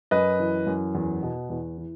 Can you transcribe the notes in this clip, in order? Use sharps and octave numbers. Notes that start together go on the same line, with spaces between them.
F#2 B4 D#5
E3
F#2
E2
B2
E2
E3